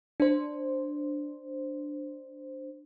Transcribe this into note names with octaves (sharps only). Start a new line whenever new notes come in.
D4 C5